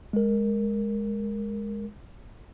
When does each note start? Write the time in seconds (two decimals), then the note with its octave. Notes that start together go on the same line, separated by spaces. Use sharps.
0.13 G#3 A#4